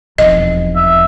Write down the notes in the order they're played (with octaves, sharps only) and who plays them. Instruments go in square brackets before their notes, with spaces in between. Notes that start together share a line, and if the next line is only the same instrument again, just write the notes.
[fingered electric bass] E1 B1 F2 [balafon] D#5
[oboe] E5